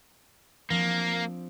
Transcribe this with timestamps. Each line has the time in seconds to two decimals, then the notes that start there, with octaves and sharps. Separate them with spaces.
0.70 F3 A#3 C4 D4